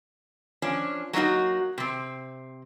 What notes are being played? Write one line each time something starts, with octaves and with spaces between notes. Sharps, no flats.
F3 C#4 D4
F#3 A3 A#3 D#4 F#4
C3 C4